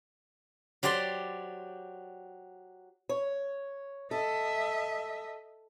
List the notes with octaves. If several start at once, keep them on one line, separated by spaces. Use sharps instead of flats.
F#3 G4 C5 D5 C6
C#5
A4 D#5 E5